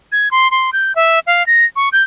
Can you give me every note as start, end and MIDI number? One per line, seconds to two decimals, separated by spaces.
0.12 0.29 92
0.31 0.50 84
0.51 0.70 84
0.73 0.95 91
0.95 1.19 76
1.27 1.45 77
1.46 1.65 94
1.76 1.89 85
1.92 2.03 91